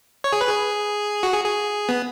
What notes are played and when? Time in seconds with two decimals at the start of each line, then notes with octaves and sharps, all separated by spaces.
0.24 C#5
0.32 G#4
0.41 B4
0.49 G#4
1.23 F#4
1.34 G#4
1.45 G#4
1.89 B3